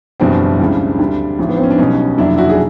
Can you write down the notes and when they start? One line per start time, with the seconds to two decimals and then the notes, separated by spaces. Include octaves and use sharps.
0.20 F#1 E2 B2 G3 C4 D4
0.59 C#2 C#3 E3 G3
0.99 D2 D3 G3
1.39 A1 G#2 F3
1.49 B3
1.57 C4
1.64 C#4
1.70 D4
1.78 B1 B2 G3 C#4 D#4
2.18 F1 D#2 D#3 F#3 D4 E4
2.37 E4 F#4
2.49 G#4